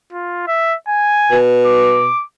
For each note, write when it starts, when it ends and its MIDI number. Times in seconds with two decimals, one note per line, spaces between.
0.12 0.43 65
0.47 0.75 76
0.88 1.38 80
1.31 2.10 47
1.66 2.23 86